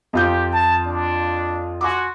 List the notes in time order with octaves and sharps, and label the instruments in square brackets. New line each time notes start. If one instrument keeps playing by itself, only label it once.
[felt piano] F2 F4 G6 [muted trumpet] G4
[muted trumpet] A5
D4
[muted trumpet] F#4 [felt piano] G#5 C6 D6